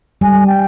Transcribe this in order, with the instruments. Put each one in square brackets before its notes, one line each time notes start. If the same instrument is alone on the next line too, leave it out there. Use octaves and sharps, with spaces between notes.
[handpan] G3 [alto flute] G#5
[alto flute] G5